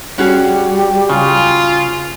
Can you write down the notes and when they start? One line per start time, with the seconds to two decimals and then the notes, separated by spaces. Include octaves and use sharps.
0.18 G3 C#4 F#4 G#4
1.10 C#3 F4